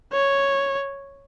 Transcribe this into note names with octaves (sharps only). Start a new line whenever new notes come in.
C#5